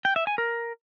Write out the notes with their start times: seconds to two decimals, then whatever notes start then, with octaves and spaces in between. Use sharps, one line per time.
0.05 G5
0.16 E5
0.27 G#5
0.38 A#4